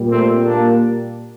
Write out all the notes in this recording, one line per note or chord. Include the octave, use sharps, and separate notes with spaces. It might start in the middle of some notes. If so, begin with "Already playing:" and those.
Already playing: A#2 G3
A3 C4
A#3 D4